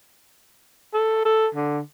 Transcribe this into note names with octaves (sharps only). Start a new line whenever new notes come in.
A4
A4
D3